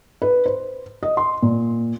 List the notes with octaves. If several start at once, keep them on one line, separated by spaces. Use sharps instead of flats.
B4
C5
D#5
C6
A#2